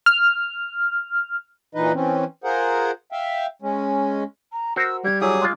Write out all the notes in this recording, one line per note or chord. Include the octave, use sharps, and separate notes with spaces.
F6
A#2 E3 D#4 B4 D#5
E3 C4 C#4
F4 G#4 A#4 C5 F#5
E5 F5 G5
G#3 C#4
A#5
F#4 A#4 C5 E6
G3 G#6
F#3 E4 G#4 D6 D#6
G#3 F4